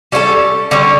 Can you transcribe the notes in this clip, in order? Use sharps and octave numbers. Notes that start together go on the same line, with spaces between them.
G3 C#4 E4 A4
D3 G3 C#4